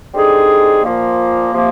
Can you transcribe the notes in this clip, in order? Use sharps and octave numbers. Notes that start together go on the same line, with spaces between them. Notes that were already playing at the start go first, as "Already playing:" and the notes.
D3 G3 C4 D#4 G#4
A#2 F3 A#3
C3 F3 A#3